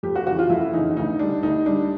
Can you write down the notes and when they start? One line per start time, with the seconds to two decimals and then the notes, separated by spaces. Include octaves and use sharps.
0.03 F2 G4
0.15 F#4
0.27 C#3 E3 F#4
0.39 F4
0.49 F2 E4
0.73 C#3 E3 D#4
0.96 D2 D#4
1.19 D3 G3 D4
1.43 D2 D#4
1.66 D3 G3 D4